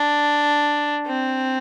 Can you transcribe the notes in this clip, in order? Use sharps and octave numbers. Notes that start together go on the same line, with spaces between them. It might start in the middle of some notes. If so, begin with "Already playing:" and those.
Already playing: D4
C4